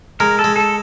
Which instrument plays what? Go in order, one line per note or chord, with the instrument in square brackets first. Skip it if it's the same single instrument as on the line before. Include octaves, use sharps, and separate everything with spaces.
[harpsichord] G#3 [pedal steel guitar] A#4
[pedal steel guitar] A4
[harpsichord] G#3
[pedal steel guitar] A4